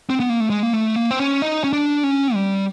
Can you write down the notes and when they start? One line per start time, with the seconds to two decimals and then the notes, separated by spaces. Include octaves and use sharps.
0.10 C4
0.20 B3
0.30 A#3
0.40 A3
0.50 G#3
0.63 A#3
0.73 A3
0.96 A#3
1.11 C4
1.19 C#4
1.42 D#4
1.64 C#4
1.73 D4
2.04 C#4
2.34 G3